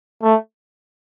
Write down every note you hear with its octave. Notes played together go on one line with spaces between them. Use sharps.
A3